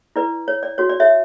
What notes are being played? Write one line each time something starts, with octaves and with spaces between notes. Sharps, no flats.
E4 B4 D5
C#5
D5
F#4 C#5
D5
C#5 E5